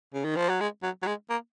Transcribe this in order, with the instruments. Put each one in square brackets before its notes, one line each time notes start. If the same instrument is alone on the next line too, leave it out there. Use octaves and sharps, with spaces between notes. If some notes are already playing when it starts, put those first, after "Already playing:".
[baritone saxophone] C#3
D#3
F3
F#3
G#3
F#3
F#3
G#3
A#3